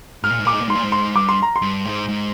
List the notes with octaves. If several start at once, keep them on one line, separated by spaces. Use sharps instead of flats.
G#2 F6
A#2
G#2
A#2 D6
G#2
A#2
G#2
A#2 C6
G#2
C6
G2 D6
C6
A#5
C6
G2
G#2
G#2